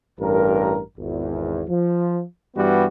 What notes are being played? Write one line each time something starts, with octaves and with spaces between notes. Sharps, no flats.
A1 G2 A#4
G#1 E2
F3
G2 E3 G3 B3 F#4